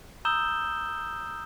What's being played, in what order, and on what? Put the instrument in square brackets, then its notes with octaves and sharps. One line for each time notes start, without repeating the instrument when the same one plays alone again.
[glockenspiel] A#5 D#6 E6 G6 E7 G7